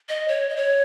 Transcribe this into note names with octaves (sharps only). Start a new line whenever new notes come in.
D#5
C#5
D#5
C#5